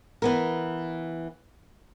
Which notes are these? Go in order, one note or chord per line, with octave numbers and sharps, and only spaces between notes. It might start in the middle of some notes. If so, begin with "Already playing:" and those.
E3 B3 A#4